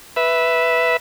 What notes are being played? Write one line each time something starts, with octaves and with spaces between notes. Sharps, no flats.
B4 E5